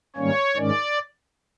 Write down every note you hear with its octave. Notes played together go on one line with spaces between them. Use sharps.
G#2 D#3 G3 A#3 C#4 C#5
G#2 D#3 G#3 C#4 D5